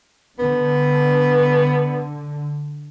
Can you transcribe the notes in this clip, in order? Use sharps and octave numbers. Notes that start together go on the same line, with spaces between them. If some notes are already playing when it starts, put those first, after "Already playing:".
D3 B3